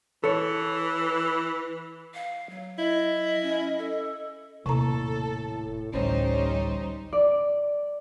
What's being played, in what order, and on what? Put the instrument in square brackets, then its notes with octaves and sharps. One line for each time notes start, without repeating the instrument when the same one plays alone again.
[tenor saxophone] E3 [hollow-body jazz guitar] A4 C#5
[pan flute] F5
F#3
[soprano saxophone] E4 [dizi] D#5
[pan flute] C#4
A4
[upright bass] D#1 [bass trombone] A2 [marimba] C3 A#5 [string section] A4
[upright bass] A1 D2 [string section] G3 D#4 C5 [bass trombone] C#4
[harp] D5